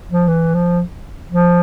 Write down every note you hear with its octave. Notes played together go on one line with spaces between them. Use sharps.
F3
E3
F3
F3